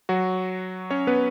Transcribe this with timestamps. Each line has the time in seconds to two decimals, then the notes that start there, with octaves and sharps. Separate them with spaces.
0.09 F#3 F#4
0.90 C#4 C#5
1.07 B3 B4